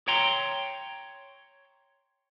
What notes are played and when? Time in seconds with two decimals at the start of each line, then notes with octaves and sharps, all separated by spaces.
0.08 C#5 G5 A#5 C6